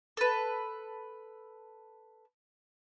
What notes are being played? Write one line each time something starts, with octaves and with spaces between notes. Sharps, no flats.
A4 B4